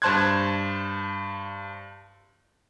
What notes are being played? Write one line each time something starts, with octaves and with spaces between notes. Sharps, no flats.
G2 C5 A5 C6 F#6 G#6